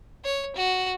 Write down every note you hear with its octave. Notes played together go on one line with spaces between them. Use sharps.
C#5
F#4